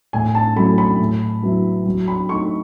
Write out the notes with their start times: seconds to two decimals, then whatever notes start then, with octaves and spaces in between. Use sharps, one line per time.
0.13 A2 G#5
0.35 A5
0.56 F#3 A3 C#4 E4 B5
0.78 B5
0.99 A2
1.43 F#3 B3 E4
1.86 F#3
2.08 B5
2.29 A3 D#4 C#6